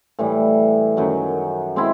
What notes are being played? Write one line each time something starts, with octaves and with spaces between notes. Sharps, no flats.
A2 E3 G3
F#2 D#3 F#3
G#3 C4 E4